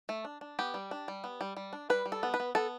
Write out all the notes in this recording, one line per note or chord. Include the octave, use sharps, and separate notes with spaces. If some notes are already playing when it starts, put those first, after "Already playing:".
A3
D4
D4
B3 G4
G3
D4
G3
B3
G3
G3
D4
G3 B4
G3
A4
B3
B4
B3
B3 A4